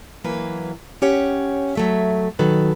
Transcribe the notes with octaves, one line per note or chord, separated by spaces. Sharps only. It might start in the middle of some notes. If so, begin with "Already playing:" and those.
E3 F#3 A#3 B4
C#4 G4 C#5 F#5
F#3 A3 E5
B2 D#3 F#3 A4 B4